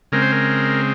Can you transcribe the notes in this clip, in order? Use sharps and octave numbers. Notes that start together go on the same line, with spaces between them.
C#3 G#3 C4 A#4
C5
A#4